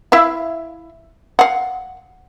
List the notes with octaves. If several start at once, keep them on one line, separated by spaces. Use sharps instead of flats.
E4 E5 F5
F5 F#5